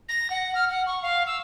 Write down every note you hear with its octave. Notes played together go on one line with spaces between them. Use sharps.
A#6
F#5
F6
F#5
C#6
F5
E6